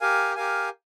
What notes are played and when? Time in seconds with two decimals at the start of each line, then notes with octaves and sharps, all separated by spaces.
0.01 G4 A#4 F5 G#5
0.35 G4 A#4 F5 G#5